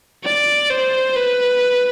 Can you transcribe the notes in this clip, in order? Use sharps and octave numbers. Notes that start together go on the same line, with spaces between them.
D5
C5
B4